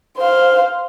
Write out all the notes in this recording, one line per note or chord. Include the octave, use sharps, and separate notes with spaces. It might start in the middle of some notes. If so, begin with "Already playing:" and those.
C5 F5